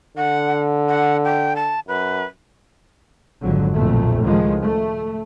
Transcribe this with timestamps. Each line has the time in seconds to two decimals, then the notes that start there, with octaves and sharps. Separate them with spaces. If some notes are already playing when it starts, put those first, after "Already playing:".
0.17 D3 F#5
0.89 F#5
1.24 G5
1.56 A5
1.88 F#2 B4
3.41 G#1 F2 D3 F#3
3.74 B1 F2 A#2 A3
4.21 C#2 A2 D#3 F3 G#3
4.61 A3